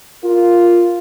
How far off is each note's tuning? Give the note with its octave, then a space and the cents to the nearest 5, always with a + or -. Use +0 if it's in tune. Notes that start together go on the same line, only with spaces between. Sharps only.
F4 +0 A#4 +0